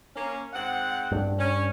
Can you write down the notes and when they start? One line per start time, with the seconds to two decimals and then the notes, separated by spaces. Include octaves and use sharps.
0.15 A#3 C#4
0.54 G#2 C4 F#5
1.12 G2
1.39 C#4